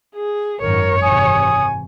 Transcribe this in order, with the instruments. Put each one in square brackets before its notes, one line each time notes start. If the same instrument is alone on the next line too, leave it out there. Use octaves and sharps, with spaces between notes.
[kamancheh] G#4
[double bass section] G#1 F#2 D#3 [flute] A#4 [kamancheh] C#5
[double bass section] G#1 C3 E3 [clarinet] G#5 [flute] D#6